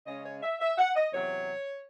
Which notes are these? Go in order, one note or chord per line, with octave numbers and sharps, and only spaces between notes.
C#3 G#3 C#4 D#5
C#5
E5
E5
F#5
D#5
E2 C3 F#3 C#5